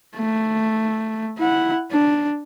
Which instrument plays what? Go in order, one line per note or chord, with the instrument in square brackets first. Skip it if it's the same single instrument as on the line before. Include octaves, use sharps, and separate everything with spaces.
[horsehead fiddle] A3
E4 F#5
D4